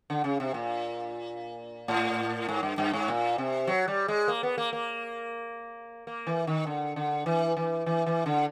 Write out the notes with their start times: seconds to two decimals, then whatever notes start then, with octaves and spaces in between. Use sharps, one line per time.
0.10 D3
0.24 C#3
0.40 C3
0.54 A#2
1.88 A2
2.49 G#2
2.63 G2
2.78 G2
2.93 G#2
3.08 A#2
3.38 C3
3.67 F#3
3.88 G3
4.08 G#3
4.28 A#3
4.43 B3
4.58 A#3
4.73 A#3
6.07 A#3
6.27 E3
6.47 D#3
6.67 D3
6.96 D3
7.26 E3
7.57 E3
7.86 E3
8.06 E3
8.26 D3